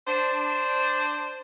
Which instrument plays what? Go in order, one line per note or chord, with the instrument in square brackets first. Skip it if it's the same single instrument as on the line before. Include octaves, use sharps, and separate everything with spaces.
[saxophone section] D4 C5